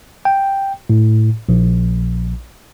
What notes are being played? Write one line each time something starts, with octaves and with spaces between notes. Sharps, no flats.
G5
A2
A#1